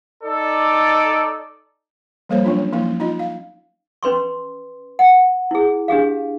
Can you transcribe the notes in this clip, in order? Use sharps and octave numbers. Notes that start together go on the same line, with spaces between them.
D#4 A4 D5
F3 G3 A#3 A4 C5 C#5
F#3 C#4 D4 F4
F3 F#3 A#3 C#4 E4
D#4 F4 D#5
F5
C#4 B4 C6 C#6
F#5
E4 G#4
D4 G4 G#4 F5